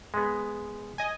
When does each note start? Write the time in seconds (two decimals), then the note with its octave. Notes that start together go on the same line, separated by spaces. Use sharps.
0.14 G#3 B3
0.98 D#5 G#5